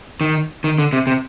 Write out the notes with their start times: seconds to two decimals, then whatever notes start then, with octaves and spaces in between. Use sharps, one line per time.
0.21 D#3
0.64 D#3
0.78 D3
0.93 C3
1.07 C3